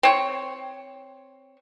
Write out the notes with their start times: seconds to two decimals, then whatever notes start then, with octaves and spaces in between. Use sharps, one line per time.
0.03 C4 C#5